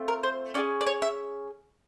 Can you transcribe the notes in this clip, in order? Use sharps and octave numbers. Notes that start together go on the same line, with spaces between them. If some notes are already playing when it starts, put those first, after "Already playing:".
Already playing: A3 C4 F4
A#4
C5
C#4 F4 G#4 D5
D5
C#5
E5